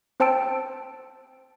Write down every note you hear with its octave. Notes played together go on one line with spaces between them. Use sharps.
C4 C5 G5 A5 E6 D7